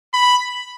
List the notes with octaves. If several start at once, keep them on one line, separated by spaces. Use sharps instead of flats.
B5